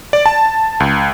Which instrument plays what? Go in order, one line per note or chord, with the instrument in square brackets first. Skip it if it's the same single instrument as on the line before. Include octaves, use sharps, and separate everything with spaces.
[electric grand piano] D5
A5
C#2